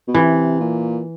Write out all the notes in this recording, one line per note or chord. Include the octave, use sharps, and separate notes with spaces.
B2
C3 E3
A#2